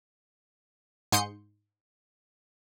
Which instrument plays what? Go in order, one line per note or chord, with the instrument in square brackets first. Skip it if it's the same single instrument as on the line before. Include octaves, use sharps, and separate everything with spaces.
[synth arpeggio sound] G#2 C6 D#6 G6 C#7